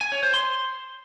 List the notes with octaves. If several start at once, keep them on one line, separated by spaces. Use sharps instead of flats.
G#5
C#5
C5
C6